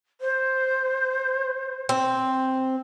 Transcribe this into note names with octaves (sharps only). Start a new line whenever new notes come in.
C5
C4